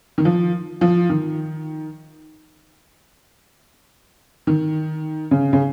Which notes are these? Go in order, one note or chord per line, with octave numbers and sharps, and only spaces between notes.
D#3
F3
F3
D#3
D#3
C#3
C#3